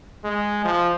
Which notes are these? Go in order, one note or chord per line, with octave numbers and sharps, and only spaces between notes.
G#3
F3